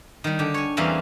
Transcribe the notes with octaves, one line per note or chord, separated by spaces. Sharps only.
D#3 G3
D3 G4
C#5 G#5
E2 E3 G3 A#3 C4 C#4